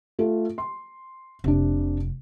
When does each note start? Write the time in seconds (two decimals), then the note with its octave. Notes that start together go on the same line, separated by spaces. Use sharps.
0.19 A3 F4 A4
0.58 C6
1.44 F1 C3 D4